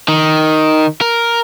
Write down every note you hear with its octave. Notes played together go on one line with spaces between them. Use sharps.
D#3
A#4